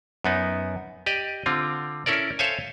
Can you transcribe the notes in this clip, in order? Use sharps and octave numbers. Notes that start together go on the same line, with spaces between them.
F#2 B3 D#4
G4 D5 D#5
D3 C4 F4
C#4 E4 A4 A#4 D5
A4 C5 C#5 E5 F5 G#5